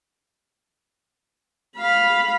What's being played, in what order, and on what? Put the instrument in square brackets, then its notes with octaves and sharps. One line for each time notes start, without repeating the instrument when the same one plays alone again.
[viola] F5 B5